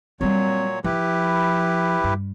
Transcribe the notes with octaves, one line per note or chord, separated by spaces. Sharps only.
A#2 F#3 G3 C4 C#5
F3 E4 G4 B4
G2